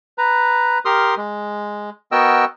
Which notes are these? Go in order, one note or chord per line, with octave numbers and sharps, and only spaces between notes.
B4 A#5
G4 A#4 C6 D#6 F6
G#3
B3 F#4 A#4 D#5 G5 E6